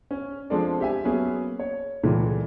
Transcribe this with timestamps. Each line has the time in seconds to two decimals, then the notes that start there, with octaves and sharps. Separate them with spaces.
0.11 C#4
0.50 F3 G#3 C4 D4 A4 D5
0.81 G4 E5 G#5
1.05 F#3 A#3 B3 C#4 G#4
1.59 C#5
2.03 C#2 A#2 E3 G#3 A3